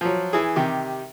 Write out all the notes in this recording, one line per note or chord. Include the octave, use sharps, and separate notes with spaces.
F3 F#3
E3 G#4
C3 D#3 G4